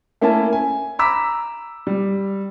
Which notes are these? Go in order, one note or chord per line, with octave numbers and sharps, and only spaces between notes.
A3 A#3 C#4 E4 E5 A5
G#5
A#5 B5 D6 E6 B6
G3